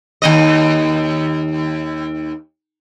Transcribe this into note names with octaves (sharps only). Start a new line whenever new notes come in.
D#2 G#2 D#5